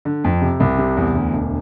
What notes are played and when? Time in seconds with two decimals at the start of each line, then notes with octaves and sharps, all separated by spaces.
0.05 D3
0.24 F2
0.41 C3
0.60 C2
0.78 C3
0.97 E2
1.15 D2
1.33 E1